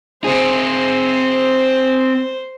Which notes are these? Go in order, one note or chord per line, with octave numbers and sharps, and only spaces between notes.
C4 G#4 C5